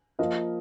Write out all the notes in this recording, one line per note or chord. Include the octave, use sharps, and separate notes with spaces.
F3 A#3 F4 A#4 D#5